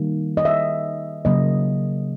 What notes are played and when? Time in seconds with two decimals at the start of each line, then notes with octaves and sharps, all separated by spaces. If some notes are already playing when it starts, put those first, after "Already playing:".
Already playing: D#3 G3 A#3
0.37 D#5
0.45 E5
1.25 C#3 F#3 A#3 D#5